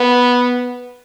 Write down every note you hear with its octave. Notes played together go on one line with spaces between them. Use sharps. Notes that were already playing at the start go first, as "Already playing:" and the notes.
Already playing: B3